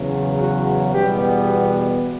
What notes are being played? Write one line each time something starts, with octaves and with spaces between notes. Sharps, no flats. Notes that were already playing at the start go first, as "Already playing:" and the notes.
Already playing: E2 C#3 F#3
F#4
E2 B2 G3 B3 G4